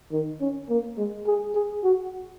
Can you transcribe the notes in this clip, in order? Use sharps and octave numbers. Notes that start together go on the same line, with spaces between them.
D#3
C#4
A#3
G#3
G#4
G#4
F#4